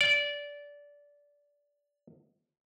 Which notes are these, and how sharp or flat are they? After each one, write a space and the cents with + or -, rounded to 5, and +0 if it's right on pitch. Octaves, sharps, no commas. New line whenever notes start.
D5 -20